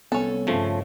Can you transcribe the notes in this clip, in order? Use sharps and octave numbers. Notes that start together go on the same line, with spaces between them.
C2 B3 C#4 A4
G2 C#3 F3 A3